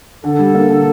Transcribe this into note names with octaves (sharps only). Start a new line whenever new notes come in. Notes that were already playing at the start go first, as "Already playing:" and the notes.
D3 A4
G3
A#3
D3